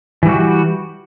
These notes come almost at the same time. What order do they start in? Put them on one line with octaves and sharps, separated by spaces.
E3 G3 F#4